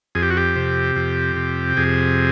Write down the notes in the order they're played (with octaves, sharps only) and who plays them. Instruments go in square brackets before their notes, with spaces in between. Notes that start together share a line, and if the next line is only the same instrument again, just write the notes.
[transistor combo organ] F2 G#4
G4
F#4
G4
C3
F2
C3
F2 G#4